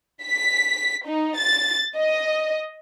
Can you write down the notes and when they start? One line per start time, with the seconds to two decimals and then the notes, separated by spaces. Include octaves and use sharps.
0.24 B6
1.06 D#4
1.37 A6
1.97 D#5